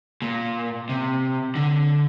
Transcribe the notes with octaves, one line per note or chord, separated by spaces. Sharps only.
A#2
C3
D3